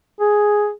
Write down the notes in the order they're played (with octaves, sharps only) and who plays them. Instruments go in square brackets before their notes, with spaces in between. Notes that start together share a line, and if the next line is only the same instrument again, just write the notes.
[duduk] G#4